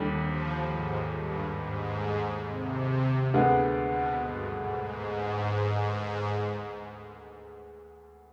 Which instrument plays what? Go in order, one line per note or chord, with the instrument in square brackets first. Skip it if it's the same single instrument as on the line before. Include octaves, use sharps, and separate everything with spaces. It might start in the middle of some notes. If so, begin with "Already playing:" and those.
Already playing: [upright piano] D#2 D3 G3
[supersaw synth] F3
G#2
G2
G#2
C3
[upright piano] D2 D3 G#3 B3
[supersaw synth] B2
G2
G#2
G#2